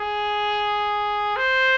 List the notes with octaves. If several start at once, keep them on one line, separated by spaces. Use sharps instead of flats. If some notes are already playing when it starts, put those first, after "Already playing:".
Already playing: G#4
C5